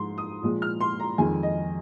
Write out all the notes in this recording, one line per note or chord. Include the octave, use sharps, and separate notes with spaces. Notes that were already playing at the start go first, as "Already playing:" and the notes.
Already playing: G#2 F3 G#3 C6
D#6
A#2 F3 G#3
F6
C6
A#5
F2 D#3 G#3 G#5
D#5